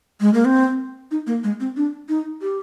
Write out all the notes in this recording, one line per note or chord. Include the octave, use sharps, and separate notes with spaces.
G#3
A#3
C4
D#4
A#3
G#3
C4
D4
D#4
G4